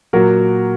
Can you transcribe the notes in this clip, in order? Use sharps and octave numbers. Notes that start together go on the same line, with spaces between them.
A#2 F#3 F#4 A#4